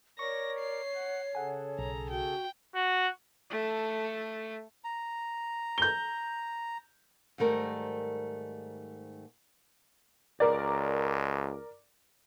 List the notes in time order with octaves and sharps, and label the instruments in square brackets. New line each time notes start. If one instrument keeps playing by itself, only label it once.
[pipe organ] A#4 D5 [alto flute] C#5 [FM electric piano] C#6 [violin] A#6
[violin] C7
[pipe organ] F#5
[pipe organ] C#3 G#4 A4 [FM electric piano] F#5 G#5
[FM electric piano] B1 [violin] A#5
[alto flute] F#4 [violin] G5
[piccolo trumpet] F#4
[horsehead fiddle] A3 A4
[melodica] A#5
[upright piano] G6 G7
[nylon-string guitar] G#2 D#3 G3 A3 A#4 C5
[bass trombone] C#2 [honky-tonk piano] A#4 D5